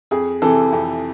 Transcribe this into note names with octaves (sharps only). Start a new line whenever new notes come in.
F2 G#4
C3 E3 A4
F2